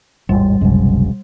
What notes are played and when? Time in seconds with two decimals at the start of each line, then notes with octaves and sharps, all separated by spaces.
0.29 A1 E2 G#2 G3
0.61 F#1 C2 F#2 B2 F3 G#3